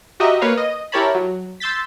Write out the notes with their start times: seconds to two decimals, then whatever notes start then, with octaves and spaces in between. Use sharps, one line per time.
0.20 F#4 G4 D#5 E5 A#5
0.42 A#3 B4 C#5 F5
0.57 D#5
0.92 E4 G4 A#4 C#5 A5 B5
1.14 F#3
1.60 C6 E6 G6 A6 B6